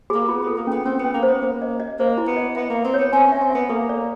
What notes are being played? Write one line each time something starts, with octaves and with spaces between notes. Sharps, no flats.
A#3 G#4
B3 F4
B3 A4
A#3
B3 C#4
C4 C#4
B3 C#4
A#3
C5
B3
A#3 C5
D#5
D#5
A#3 C5
E4
B3
D#5
B3 E5
A#3 E5
C4
B3 C#5
C4 G#5
C#4 E5
C4
B3 E5
A#3 A4
D5